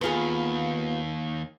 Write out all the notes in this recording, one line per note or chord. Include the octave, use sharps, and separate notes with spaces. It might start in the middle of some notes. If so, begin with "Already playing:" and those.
D#2 B3 F4 G#4